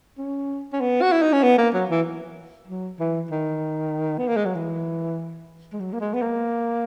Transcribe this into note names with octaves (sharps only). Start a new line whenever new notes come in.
C#4
C#4
B3
F#4
E4
D#4
C#4
B3
A#3
F#3
E3
F#3
E3
D#3
B3
A#3
G#3
F#3
E3
G#3
F#3
A#3
G#3
B3
A#3